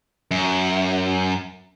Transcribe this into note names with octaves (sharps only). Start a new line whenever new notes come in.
F#2